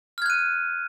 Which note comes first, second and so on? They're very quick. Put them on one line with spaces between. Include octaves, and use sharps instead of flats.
F6 G#6 F#6 D#7